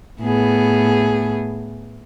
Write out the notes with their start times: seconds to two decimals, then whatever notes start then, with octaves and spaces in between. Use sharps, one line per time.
0.21 A2 B3 G#4